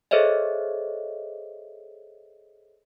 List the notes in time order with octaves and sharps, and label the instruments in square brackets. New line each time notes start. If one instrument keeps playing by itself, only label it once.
[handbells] G#4 A4 C5 C#5 D#5 E5